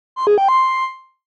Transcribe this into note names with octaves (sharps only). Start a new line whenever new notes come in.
C6
G#4
G5
C6